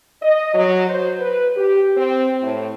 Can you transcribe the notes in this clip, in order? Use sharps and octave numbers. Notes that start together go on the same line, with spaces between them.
D#5
F#3
C5
B4
G4
C4
A2